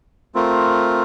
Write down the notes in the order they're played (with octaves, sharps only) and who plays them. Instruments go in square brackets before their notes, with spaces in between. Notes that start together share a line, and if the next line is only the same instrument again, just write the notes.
[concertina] A3 C4 F4 A#4